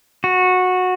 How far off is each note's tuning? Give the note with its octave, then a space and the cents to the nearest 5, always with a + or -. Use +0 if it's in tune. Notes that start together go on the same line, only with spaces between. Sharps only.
F#4 -15